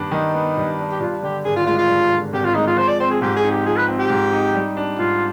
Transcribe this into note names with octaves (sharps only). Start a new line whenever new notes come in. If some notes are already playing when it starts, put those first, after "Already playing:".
Already playing: G2 D#3 B3 D4
D#3 D#4
B3
G2
D4
G4
G2 F4
D3 G4
G#1 G#4
F4
G#3 F4
F4
G2
D3
G#1 G4
F4
G#3 D#4
F4
F3 C5
D5
C4 C5
G#4
G#2 G4
G#4
D#4
G4
F3 G#4
B4
C4
G4
G#2
D#4
G3
D4
G#2 F4